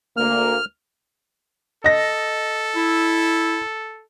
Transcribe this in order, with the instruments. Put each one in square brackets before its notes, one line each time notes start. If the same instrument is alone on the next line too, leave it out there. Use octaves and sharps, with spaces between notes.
[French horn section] D2 A#3 [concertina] F6
[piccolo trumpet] A4 [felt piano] D#5 A#6
[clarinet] E4